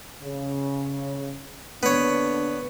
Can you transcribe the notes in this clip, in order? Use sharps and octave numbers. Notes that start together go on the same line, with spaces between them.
C#3
D3 A#3 B3 D4 C#5